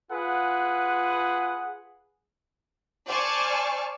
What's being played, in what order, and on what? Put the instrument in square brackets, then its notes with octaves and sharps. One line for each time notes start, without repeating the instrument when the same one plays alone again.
[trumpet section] F4 G#4 B4 F#5
[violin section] C5 D5 G#5 A5 C#6 F6